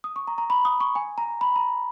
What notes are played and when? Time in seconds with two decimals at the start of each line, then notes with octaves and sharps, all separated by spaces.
0.04 D#6
0.16 C#6
0.28 A#5
0.38 A#5
0.50 B5
0.65 D#6
0.80 C#6
0.95 G#5
1.18 A#5
1.41 B5
1.56 A#5